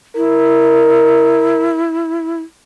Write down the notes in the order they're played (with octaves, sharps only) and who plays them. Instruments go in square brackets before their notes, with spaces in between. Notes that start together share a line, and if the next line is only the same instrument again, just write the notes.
[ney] E4 [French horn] A#4